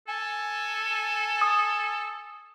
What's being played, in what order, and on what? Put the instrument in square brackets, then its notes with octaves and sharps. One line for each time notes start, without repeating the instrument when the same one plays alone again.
[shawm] A4 [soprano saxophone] G#5
[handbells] D#6